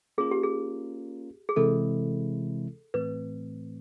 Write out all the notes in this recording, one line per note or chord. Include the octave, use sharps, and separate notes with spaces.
A#3 C#4 F4 G#4 A#4
G4
G#4
G#4
C3 E3 G#3 C4 E4 A4
A2 E3 A3 C4 B4